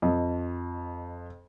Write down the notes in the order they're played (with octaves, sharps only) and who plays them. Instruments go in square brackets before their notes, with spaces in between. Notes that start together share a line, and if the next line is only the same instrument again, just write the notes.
[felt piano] F2 D#5